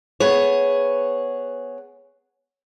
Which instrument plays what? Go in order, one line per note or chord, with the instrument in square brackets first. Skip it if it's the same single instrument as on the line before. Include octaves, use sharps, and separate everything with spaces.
[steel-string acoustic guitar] B3 G#4 C#5